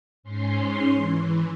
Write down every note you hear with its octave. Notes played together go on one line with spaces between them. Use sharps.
G#2 C#4 C6
E3